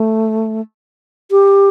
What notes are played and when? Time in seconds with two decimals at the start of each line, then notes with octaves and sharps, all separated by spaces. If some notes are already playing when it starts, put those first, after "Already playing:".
Already playing: A3
1.31 G4